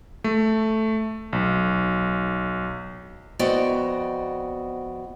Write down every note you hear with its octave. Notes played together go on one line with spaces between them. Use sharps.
A3
B1
F2 B3 F#4 D5 D#5 G5